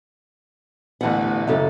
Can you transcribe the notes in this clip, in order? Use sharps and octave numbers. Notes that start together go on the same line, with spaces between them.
A1 D2 E3 B3 F#5
F#2 C#3 A4